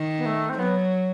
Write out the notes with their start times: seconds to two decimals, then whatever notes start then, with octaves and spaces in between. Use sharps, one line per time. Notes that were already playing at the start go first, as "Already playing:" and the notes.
Already playing: D#3
0.18 B3
0.25 A3
0.49 C4
0.58 F#3 B3